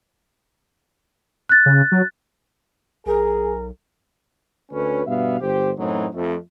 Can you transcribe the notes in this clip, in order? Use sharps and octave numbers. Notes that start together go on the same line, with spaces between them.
F#6 A6
C#3
F#3
B1 G#4 A#4
D2 C#4 B4
G2 B2 B3 E5 F5
G1 G4 C5
F#2 A2 E3 F#3 C4 D#4
F2 A3